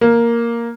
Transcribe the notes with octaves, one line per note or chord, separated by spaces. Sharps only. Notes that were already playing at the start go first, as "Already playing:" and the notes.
A#3